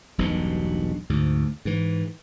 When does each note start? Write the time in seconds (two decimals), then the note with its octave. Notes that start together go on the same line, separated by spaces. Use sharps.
0.18 E1 B1 G2 B2
1.10 D2 G#2
1.65 G#2 E3